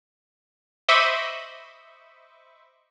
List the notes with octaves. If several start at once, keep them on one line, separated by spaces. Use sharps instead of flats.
C5 D#5 E5 B5 C#6 D6